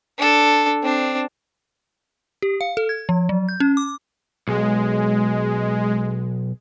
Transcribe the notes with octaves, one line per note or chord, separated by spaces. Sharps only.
D4 A4
C4 D4
G4
F5
A4
G#6
F3
F#3
G6
C#4
D6
B1 G#3